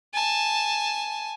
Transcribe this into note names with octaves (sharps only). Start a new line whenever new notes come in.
G#5 A5